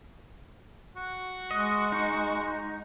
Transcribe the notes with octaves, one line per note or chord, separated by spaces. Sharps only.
F#4
G#3 D#5
D#4